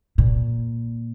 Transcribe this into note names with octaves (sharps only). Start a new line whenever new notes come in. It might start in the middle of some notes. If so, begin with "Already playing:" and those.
A#2